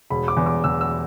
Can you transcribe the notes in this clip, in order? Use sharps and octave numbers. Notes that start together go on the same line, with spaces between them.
E1 B5
D6
E2
D6
E2 E6
E6